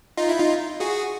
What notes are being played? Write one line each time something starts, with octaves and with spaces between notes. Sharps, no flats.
D#4 F4
E4
D#4 F4
F#4 G#4